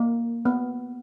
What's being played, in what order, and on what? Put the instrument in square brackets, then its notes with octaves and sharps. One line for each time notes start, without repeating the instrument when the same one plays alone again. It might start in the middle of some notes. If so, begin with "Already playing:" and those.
Already playing: [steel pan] A#3
B3